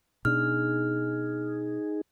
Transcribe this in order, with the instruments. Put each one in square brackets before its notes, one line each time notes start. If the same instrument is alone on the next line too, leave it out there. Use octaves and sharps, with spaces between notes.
[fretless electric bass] B2 D4 [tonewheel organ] D#4 G#4 [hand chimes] F6